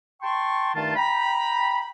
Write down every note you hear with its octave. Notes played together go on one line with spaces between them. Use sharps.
G5 A5 C6 C#6
G2 D#3 A3 D#4 F4 A5
G5 A#5 B5